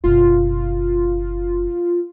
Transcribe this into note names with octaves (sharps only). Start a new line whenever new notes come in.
F#1 B2 F4